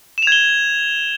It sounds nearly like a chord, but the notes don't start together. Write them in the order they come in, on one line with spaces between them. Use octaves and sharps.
E7 F7 G#6 G7